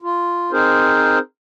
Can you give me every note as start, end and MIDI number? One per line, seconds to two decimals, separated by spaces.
0.02 0.52 65
0.52 1.19 60
0.52 1.19 63
0.52 1.19 68
0.52 1.19 70
0.52 1.19 72